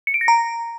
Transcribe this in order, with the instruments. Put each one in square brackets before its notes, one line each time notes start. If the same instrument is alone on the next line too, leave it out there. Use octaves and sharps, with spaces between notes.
[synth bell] C#7
D7
A#6
A#5